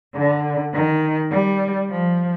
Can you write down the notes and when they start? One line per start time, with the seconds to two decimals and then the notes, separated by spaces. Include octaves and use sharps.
0.16 D3
0.74 D#3
1.32 G3
1.91 F3